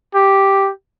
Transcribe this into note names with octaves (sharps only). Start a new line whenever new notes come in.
G4